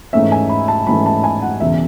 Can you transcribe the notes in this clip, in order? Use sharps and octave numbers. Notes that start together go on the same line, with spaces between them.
G#2 E3 A3 C#4 E5
G#5
B5
A5
G#2 E3 A3 C#4 B5
A5
G#5
F#5
E1 E2 C#3 E5